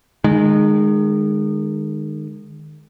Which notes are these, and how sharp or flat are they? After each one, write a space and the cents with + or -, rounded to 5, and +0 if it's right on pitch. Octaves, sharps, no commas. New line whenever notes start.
D#3 -30 G#3 +0